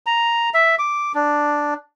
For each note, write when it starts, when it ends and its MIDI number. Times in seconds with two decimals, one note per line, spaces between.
0.06 0.50 82
0.54 0.75 76
0.79 1.12 86
1.14 1.74 62